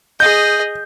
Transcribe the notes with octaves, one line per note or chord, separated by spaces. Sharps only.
G#4 D#5 G6